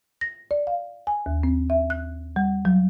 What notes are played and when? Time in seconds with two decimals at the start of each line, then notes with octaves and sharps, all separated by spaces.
0.21 A#6
0.51 D5
0.67 F5
1.07 G#5
1.26 D#2
1.43 C4
1.70 E5
1.90 F#6
2.36 G3
2.65 F#3